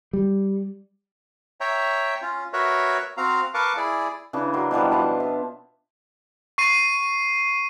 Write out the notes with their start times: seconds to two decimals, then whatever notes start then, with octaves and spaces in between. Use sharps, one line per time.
0.13 G3
1.61 C#5 E5 G5 A#5
2.22 C#4 F4
2.53 F#4 A#4 B4 C#5 E5
3.17 C4 F#4 F5 A#5
3.54 A#4 B4 F5 A5 C#6 D6
3.77 E4 G#4 D5
4.33 C#3 E3 D4
4.53 F#3 A#4 C6
4.71 B2 E3 F3 G3
4.91 D4 F4 A5
5.20 E5
6.58 C#6 C7 D#7